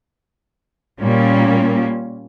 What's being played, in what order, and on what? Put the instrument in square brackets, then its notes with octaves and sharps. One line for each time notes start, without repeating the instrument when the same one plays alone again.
[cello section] A#2 G3 A#3 C#4